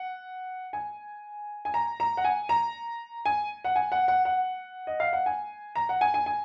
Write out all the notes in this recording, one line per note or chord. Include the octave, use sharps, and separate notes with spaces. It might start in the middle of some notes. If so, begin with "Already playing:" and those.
Already playing: F#5
G#5
G#5
A#5
A#5
F#5
G#5
A#5
G#5
F#5
G#5
F#5
F#5
F#5
D#5
F5
F#5
G#5
A#5
F#5
G#5
G#5
G#5